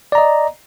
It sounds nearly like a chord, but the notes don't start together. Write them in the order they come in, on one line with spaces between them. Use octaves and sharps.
D5 A#5 D#5